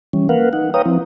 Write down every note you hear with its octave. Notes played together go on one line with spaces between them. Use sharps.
E3 G3 C#4
A#3 A#4 B4 F5 F#5
D#4 F#5
B4 C#5 F5 G5 A#5 D#6
F3 C4 E4